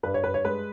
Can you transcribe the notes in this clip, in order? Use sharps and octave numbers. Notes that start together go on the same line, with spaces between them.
G2 B4
C#5
G2 B4
C#5
G#3 B4